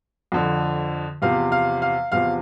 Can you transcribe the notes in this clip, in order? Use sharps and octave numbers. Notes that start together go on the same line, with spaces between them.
F2 D3 F3
E2 C3 F3 F5
F5
F5
E2 C3 F3 F5